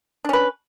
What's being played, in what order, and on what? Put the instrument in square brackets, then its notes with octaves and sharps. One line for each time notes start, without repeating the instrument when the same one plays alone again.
[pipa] D4
C#4
B4